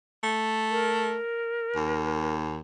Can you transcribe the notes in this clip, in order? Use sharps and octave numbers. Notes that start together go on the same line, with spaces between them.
A3
A#4
D#2